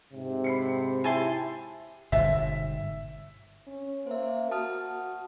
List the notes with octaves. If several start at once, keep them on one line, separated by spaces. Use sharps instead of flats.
G#2 C3
B5 C7 C#7
E4 G4 G#5 A5 C6
G1 G#2 B2 E5
C#4
A#3 C5 E5
F#4 A5 D#6 F6